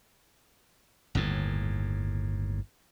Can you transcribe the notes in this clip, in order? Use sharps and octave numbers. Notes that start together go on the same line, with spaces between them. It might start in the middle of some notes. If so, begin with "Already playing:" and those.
G1 D#2 A2